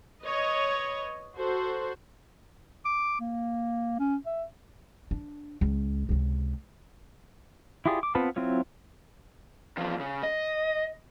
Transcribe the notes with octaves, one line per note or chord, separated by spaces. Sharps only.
B4 C#5 D#5
F#4 A4 C5
D6
A#3
C#4
E5
D4
C#2
C#2 C3
E4 F4 G4 G#4 D5
D6
B3 C4 F4 B4 A5
F#3 C4 E4 F4 C#5
E2 F3
C#3
D#5